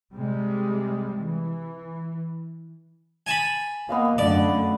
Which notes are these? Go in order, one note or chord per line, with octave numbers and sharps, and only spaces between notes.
C3 G3 G#3
E3
G#5 A5 B5
A#3 B3 D#5 F5
F#2 D3 A3 D5